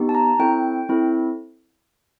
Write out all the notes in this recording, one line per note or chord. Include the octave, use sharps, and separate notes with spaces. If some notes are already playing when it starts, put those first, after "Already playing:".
Already playing: B3 D#4 G4
A5
A#5
C4 E4 A4 G5
C4 E4 A4